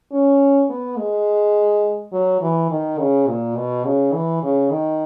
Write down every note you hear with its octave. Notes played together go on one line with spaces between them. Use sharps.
C#4
B3
G#3
F#3
E3
D#3
C#3
A#2
B2
C#3
E3
C#3
D#3